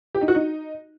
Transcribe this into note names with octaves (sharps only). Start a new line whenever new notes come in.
G4
D#4
F#4
D#4